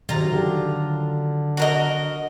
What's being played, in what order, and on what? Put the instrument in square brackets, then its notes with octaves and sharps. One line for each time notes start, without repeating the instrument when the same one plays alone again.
[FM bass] C3 [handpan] D#3 F#3 [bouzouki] F4 A#5
[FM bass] D3 [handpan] G4
[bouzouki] F#4 A#4 D#5